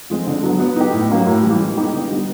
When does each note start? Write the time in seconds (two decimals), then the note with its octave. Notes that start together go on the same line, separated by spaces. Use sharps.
0.10 F3 G#3 C4
0.27 D3
0.43 F#3 B3
0.60 B3
0.76 D#4 G4
0.93 A2
1.10 F#3 A#3 C#4
1.26 A2
1.43 E3 G3
1.59 G#3
1.77 B3 D#4 G4
1.93 D3
2.10 G3 B3